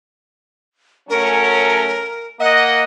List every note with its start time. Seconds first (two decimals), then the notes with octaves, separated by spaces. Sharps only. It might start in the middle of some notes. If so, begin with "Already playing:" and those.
1.10 F#3 A3 C#4 A#4
2.40 A#3 D#5 F#5